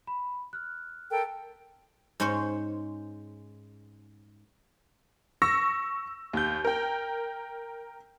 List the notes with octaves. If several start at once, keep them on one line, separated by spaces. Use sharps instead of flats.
B5
F6 F#6
A4 A#4 G5
G#2 G#3 C#4 C5 C#5
C#6 E6 A#6
D#2 G6
A#4 G5